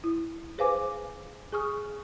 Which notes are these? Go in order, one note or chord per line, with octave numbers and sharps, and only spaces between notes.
E4
G#4 B4 C5 F5 G#5 D6
G#4 G#5 C#6 D#6 F6